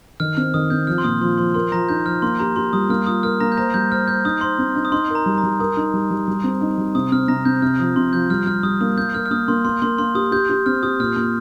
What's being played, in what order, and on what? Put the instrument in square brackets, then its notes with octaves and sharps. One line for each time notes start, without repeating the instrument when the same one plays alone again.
[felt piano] D#3 [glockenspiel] F6
[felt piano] C4 [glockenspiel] F6
[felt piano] D#3 [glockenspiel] D#6
[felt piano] C4 [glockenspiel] G6
[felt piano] F3 [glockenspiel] F6
[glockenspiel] C6
[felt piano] A#2 [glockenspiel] D#6
[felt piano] F3 [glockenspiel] C6
[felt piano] F3 [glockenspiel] C6
[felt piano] A#4 [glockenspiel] C6
[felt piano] F3 [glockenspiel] A#5 A#6
[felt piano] D#4 [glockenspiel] G6
[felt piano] F3 [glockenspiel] F6
[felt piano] A#3 [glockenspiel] C6
[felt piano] G4 [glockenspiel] A#5
[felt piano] G4 [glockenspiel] C6
[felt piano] G3 [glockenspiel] D#6
[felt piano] A#3 [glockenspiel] F6
[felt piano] F4 [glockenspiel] D#6
[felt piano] A#4 [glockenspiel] F6
[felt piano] A#3 [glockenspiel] A#5 A#6
[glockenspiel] G6
[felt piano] C5 [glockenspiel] A#5 A#6
[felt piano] G3 [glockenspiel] G6
[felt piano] C5 [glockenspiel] F6
[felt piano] C5 [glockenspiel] G6
[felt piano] D#4 [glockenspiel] D#6
[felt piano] C5 [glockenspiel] C6
[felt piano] C4
D#4
[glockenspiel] D#6
[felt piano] D#4 [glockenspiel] C6
[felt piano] A#4
[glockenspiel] A#5
[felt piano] G3
[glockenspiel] A#5
[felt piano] G3
[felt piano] A#4 [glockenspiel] D#6
[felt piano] D#4
G3
G3
G3
C4
D#4
G3
[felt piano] C3 [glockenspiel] D#6
[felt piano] C4 [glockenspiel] F6
[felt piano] C3 [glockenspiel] A#5 A#6
[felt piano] C4 [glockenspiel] G6
[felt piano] C3 [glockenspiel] F6
[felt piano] F3 [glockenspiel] D#6
[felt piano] C3 [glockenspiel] C6
[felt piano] F3 [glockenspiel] G6
[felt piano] G3 [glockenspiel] F6
[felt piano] G3 [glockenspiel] F6
[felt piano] G3 [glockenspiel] D#6
[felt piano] A#3 [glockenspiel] D#6
[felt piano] A#3 [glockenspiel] G6
[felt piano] A#4 [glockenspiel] F6
[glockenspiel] F6
[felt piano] A#3 [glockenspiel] D#6
[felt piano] A#3 [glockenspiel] C6
[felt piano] A#3 [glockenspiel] C6
[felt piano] A#3 [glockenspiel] C6
[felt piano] A#3 [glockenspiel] C6
[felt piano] G4 [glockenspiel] D#6
[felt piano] G4 [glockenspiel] G6
[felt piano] G4
[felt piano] C4 [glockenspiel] F6
[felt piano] G4 [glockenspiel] D#6
[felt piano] A#2 [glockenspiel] F6
[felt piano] A#2